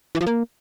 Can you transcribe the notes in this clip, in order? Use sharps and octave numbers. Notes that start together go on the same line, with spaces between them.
E3
F3
A#3